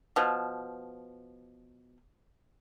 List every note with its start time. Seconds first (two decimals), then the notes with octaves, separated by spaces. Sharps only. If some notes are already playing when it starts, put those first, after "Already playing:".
0.16 B2 F3